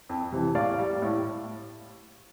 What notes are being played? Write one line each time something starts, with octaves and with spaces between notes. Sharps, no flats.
F2
C3 E3
A2 D5 F5
G3
A2